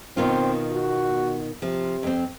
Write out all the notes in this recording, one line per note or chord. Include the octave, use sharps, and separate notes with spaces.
B2 D#3 C4 F4
F#4
C3 F3
F2 C4